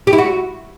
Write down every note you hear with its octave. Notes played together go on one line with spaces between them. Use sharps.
G4
E4
F#4